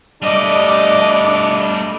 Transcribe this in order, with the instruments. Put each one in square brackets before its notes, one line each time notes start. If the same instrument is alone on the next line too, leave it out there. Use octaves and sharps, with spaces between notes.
[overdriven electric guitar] G3 A3 [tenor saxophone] D4 [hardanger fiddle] D#5 D6